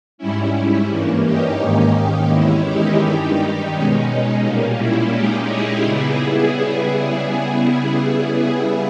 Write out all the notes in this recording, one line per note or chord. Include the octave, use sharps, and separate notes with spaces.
G#2 G3 C#4 E4
G2 E3 A#3 C#4
D#4 G4
G#2 D#3 A#3 C#4 D#4 G4
E2 D#3 G#3 C#4 E4
D#4 G4
G2 D#3 G3
D#4
B2 G#3 C#4
A#2 G3 A#3 C#4
E4
A#2 G#3 C#4 D#4 G4
E4 G#4
C#3 G3 B3